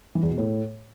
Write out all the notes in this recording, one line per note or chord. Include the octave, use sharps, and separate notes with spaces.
E3
E2
B2
A2